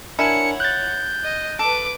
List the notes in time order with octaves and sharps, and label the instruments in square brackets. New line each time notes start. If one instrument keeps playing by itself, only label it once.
[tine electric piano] D4 A#4 G#5 [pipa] E4 [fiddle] C#5 F#5 [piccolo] C#7
[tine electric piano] F#6 A6 [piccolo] G6
[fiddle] D#5
[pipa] A4 [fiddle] B4 D6